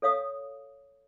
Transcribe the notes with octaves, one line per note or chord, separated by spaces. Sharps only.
A4 C#5 F5 D#6